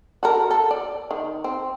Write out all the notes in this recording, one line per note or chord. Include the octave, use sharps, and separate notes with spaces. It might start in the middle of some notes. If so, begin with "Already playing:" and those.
F#4 A4 A#4
A4
D5
D#3
C4